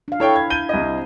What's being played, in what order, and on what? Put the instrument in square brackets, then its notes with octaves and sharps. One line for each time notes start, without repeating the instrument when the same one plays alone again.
[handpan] D4 F5
[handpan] E4 [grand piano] A4 C#5 G5
[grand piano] G#6
G6 D#7 G7
C2 D#5
[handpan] C4